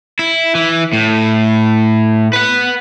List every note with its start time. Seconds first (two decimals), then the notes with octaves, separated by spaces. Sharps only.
0.19 E4
0.55 E3
0.93 A2
2.33 B4 F#5